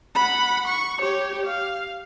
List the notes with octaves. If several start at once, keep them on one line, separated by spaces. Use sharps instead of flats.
F#5 B5
C#6
G4 C#5
F5